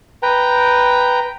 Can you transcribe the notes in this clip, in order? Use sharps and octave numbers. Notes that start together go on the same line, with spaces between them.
B4 G5 A#5